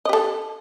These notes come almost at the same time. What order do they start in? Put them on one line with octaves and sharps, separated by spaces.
D#5 G4 A4